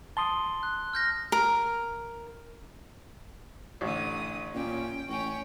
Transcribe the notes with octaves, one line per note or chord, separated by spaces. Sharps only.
A5 C6 D#6 G7
F#6
F6 G6 A#6
A#4
A1 D3 D#6
A#2 C#4 G5
A1 C#4 G5 C#6